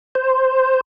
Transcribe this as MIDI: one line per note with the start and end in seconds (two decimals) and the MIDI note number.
0.15 0.81 72